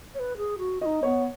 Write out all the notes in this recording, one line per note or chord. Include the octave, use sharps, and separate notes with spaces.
C#5
B4
G#4
F#4
D#4 F#4 D#5
B3 C#5